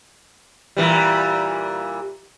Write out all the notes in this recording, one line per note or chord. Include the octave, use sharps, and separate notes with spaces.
A#2 E3 G3